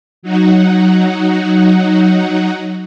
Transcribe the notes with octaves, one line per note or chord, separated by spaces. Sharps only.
F#3 D#4 F#4